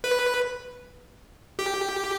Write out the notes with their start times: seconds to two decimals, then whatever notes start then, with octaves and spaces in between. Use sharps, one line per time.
0.04 B4
1.59 G4